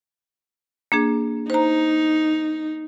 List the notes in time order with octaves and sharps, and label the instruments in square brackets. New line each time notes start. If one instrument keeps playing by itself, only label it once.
[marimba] A#3 D4 G#4
[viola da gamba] D#4 [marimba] C5 A#5